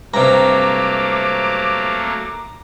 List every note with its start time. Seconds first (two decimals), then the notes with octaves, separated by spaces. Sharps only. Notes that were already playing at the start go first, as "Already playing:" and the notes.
0.14 G2 C3 F#3 A3 A#3 A#5 D6